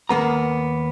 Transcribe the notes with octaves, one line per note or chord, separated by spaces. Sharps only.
D#2 A#3 B3 A#5